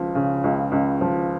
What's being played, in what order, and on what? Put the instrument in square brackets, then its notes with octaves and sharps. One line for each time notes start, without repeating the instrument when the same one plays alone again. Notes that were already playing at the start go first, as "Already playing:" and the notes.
Already playing: [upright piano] C#2 F3
C#3
C#2
C#2
F3